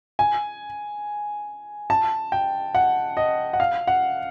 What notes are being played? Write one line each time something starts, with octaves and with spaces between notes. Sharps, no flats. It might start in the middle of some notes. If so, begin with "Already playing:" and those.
G#5
A5
G5
F#5
D#5
F#5
F5
F#5